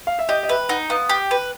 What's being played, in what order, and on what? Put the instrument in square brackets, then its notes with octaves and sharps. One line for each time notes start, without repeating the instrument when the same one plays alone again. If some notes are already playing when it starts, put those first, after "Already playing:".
[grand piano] F5
E5
[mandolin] G4 [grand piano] D#5
[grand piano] D#5
[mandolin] B4 [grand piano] E5
[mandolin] D#4 [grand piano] F#5
[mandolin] B3 [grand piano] F5
[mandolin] G4
B4